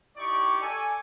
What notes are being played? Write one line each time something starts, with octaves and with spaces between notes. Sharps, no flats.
D#4 E4 G4 D5 C#6
A4 D5 G#5